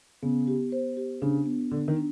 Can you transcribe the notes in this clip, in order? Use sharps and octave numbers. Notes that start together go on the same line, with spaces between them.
C#3 B3
G4
C5
G4
C#3 D4
B3
D3 D4
D#3
D4